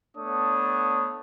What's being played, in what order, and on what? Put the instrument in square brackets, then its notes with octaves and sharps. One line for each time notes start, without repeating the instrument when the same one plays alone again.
[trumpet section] A3 B3 D4 C#5 D#6